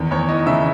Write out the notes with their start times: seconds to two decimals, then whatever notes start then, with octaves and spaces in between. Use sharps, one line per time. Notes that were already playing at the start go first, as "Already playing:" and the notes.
Already playing: E2 D#3
0.11 E2 C#5
0.29 E3 D#5
0.47 C#3 E5